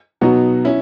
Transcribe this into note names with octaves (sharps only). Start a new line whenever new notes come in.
B2 F#3 B3 D#4 F#4
C#4 E4